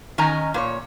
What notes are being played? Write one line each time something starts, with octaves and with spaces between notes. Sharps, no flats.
D#3 C#4 D#5 G#5 A#5
A#2 B4 C#5